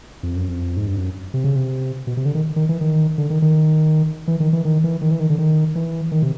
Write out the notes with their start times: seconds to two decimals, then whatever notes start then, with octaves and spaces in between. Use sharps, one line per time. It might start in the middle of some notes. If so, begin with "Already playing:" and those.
0.23 F2
0.36 F#2
0.48 F2
0.77 G#2
0.87 G2
0.97 F#2
1.34 C3
1.44 C#3
1.55 C3
2.07 B2
2.17 C3
2.25 D3
2.35 D#3
2.56 D#3
2.69 E3
2.81 D#3
3.18 D3
3.30 D#3
3.42 D#3
4.28 E3
4.40 D#3
4.53 E3
4.65 D#3
4.84 E3
5.01 D#3
5.11 E3
5.20 D#3
5.30 D3
5.38 D#3
5.75 E3
6.12 D#3
6.22 C3